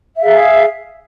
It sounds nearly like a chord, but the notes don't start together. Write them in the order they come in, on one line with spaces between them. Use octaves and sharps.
E5 F5 G#4